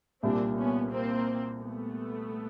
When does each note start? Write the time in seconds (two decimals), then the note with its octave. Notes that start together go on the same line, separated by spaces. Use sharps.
0.23 C2 A#2 G3 C4 D4
0.58 B3 C#4
0.91 A#3 C4
1.60 A3 B3